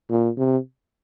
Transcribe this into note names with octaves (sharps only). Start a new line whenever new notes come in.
A#2
C3